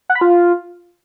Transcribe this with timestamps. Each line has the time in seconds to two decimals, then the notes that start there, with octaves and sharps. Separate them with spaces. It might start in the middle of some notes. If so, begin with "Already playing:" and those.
0.09 F#5
0.15 B5
0.21 F4